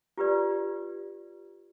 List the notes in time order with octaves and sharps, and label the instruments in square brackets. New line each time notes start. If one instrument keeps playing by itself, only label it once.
[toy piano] F4 G4 B4 D5